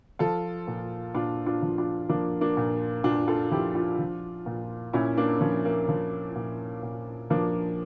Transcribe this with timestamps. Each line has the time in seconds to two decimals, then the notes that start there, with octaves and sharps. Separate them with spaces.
0.19 F3 F4 A4
0.67 A#2
1.15 A#2 D4 F4
1.46 D4 F4
1.62 F3
1.78 D4 F4
2.09 F3 A#3 D4
2.41 A#3 D4
2.57 A#2
3.04 A#2 D4 F4
3.28 F4 A4
3.51 F3 E4 G4
3.75 D4 F4
3.99 F3
4.46 A#2
4.93 A#2 C#4 E4
5.17 A#3 D4
5.41 F3 C#4
5.65 A#3
5.89 F3
6.36 A#2
6.83 A#2
7.30 F3 A#3 D4